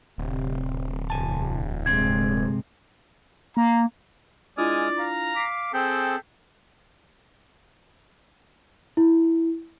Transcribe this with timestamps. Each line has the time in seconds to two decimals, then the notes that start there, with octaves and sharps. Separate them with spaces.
0.18 D1 C3 C4
1.10 E2 C3 G#5 A5
1.86 A#1 G2 C3 G#3 C4 G#6
3.57 A#3 A#5
4.58 G#3 D4 E4 F4 D5 G#5 D#6 F6
4.99 F5 A#5
5.36 D6 B6 C7
5.74 C4 G#4 A4 G5
8.97 E4